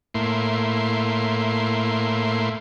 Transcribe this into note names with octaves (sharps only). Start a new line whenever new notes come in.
A2 A#3 E4 C6